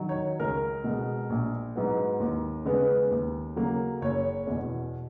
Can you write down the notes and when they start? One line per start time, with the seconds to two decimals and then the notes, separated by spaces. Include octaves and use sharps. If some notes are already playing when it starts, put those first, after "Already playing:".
Already playing: D#3 F#3
0.09 C#5
0.40 C#2 A#4
0.84 B2 G#3
1.30 A#1
1.76 G#2 F#3 B3
2.20 D#2
2.65 C#3 G#3 B3
3.11 D#2
3.56 C#3 F#3 A#3
4.02 F#1 C#5
4.47 E2 B2